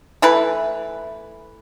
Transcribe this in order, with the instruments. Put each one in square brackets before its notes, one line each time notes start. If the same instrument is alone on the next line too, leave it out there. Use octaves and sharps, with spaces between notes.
[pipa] E3 A3 E4 B4